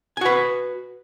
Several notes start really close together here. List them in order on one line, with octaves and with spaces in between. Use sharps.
G#5 F#4 B4